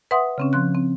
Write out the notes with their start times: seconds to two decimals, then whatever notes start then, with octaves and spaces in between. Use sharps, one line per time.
0.11 B4 E5 F#5 C6 D#6
0.38 C#3 C4 C#4
0.53 F3 C6 F#6
0.75 C4